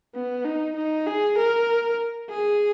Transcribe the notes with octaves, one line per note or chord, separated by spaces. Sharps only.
B3
D#4
D#4
G#4
A#4
G#4